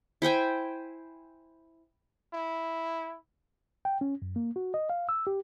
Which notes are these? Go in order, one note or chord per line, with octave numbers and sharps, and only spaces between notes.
E4 C5 G5 G#5
E4
G5
C#4
F#2
A#3
F#4
D#5
F5
E6
G4